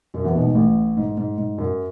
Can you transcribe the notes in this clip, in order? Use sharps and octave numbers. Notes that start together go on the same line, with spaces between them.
F#2 F#3
E2 E3
B1 B2
G#2
A1 A2
G#2
G#2
G#2
F#2